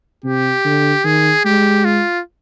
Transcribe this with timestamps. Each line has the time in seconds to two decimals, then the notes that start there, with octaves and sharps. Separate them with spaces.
0.24 C3 G4
0.65 D3
1.04 D#3 G#4
1.45 G#3 G4
1.85 F4